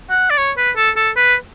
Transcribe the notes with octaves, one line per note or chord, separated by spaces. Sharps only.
F#5
D5
C#5
B4
A4
A4
B4